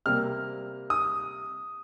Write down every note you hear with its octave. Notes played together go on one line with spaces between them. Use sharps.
C3 G3 A#3 F6
D#6